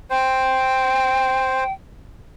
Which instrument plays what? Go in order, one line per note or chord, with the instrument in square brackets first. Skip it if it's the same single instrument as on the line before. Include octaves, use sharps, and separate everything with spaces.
[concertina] C5 [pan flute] G5